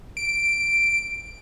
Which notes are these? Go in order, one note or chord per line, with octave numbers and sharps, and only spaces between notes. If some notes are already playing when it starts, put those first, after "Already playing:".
D7